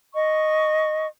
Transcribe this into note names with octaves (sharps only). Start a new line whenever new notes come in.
D#5 C#6